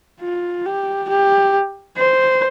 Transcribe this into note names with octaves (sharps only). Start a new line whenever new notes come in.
F4
G4
G4
C5